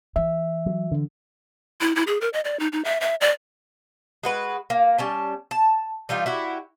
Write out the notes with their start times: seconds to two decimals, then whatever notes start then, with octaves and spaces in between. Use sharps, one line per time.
0.16 E3 E5
0.66 F#3
0.92 D3
1.81 E4
1.96 E4
2.07 G#4
2.21 A#4
2.33 D#5
2.45 D5
2.60 D#4
2.73 D#4
2.85 E5
3.01 E5
3.21 D5
4.23 G#3 F#4 B4
4.70 A#3
4.98 G3 C#4 A5
5.51 A5
6.09 E3 G3 D#4 F4
6.26 E4 F#4 G4